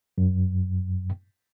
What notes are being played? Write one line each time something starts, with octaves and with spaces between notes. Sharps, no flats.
F#2